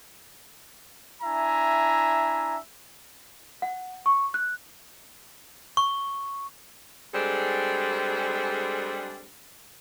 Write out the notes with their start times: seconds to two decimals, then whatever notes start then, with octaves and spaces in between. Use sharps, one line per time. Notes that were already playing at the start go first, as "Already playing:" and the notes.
1.23 D4 E4 E5 G#5 A#5
3.62 F#5
4.06 C#6
4.34 F#6
5.77 C#6
7.14 G3 G#3 C4 D4 G#4 A4